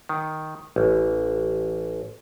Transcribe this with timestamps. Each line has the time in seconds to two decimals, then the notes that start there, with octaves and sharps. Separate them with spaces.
0.09 D#3
0.76 A1